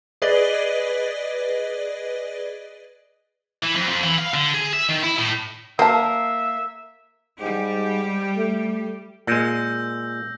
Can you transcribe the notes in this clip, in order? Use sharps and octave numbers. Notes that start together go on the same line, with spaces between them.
G#4 B4 D5 D#5
E3
F2
F2
E3
F5
D3
G#4
E5
D#3
E4
A2
F#3 A#3 E5 A5
G#2 G3 G4
A3
A#2 G#3 E6 G6 A#6